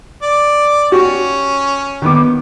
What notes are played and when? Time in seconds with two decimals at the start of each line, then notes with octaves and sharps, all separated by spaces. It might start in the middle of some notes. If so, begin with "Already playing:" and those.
0.22 D5
0.92 C#4 F#4 G4
2.02 D#3 B3 D6